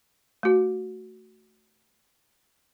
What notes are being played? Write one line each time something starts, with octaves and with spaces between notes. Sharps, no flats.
A3 F#4